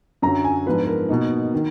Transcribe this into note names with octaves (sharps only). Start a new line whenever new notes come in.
F#2 D3 F#3 A#5
G#5
G#2 F3 B3 D4 F4 B4
B4
A#4
B2 A#3 D#4
D#3